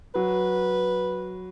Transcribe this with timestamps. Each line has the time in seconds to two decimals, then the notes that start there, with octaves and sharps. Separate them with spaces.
0.14 F#3 B4